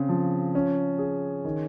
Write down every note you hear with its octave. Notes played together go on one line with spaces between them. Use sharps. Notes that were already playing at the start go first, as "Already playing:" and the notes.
Already playing: C#3 C4
F3
C#4
G#4
D#3